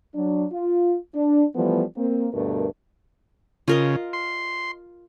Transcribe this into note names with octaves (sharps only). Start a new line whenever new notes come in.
F#3 D4
F4
D4
E3 F3 G3 A3 B3
A#3 C4
D2 G2 B2 A3 A#4
C#3 F4 A#4 D#5
C6